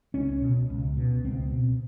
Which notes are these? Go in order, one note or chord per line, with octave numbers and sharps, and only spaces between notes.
C#2 C#4
B2
C#2
B2
C#2 C4
B2